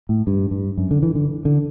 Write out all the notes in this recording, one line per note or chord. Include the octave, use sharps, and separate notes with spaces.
A2
G2
G2
F#2
D3
E3
D3
D3